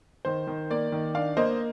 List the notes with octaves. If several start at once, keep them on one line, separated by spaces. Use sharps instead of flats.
D#3 C5
D#3
A#3 D5
D#3
D4 D5 F5
A#3 C5 D#5